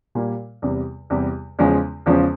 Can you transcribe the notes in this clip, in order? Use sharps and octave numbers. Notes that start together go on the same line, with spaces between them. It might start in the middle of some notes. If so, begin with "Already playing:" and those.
A#2 G3 A#3
E2 C3 G3
E2 C3 G3
E2 C#3 F3 G#3 C#4
E2 C#3 F3 G#3 C#4